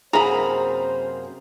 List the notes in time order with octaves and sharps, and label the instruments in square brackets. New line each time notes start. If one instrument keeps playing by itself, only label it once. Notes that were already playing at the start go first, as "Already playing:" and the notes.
[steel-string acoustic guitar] F#2 C3 A#3 [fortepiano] G#4 [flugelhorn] C5 [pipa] A#5 B5